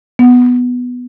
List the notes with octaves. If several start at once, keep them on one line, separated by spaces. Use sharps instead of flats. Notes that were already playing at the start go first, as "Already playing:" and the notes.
B3